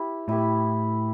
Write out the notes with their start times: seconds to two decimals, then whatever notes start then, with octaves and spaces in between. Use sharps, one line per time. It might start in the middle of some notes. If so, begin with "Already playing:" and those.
Already playing: E4 G4 B4
0.28 A2 E4 G4 B4